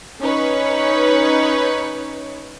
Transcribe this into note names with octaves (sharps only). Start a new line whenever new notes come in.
C#4 D#4 B4 C#5